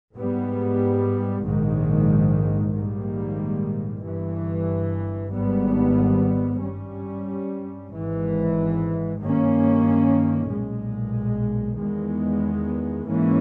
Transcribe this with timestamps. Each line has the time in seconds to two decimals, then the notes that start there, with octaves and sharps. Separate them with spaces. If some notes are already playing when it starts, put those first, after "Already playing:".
0.16 G#2 G3 B3
1.44 A#1 G#2 D#3
2.74 A#1 G#2 D#3 G3 A#3
4.03 G1 G2 E3
5.32 G#1 G#2 G3 B3
6.62 G2 G3 C#4
7.90 G#1 G#2 E3
9.20 G2 D#3 A#3 C#4
10.49 B1 A#2 G#3
11.78 E2 D#3 G#3 B3
13.08 G#2 E3 A#3 C#4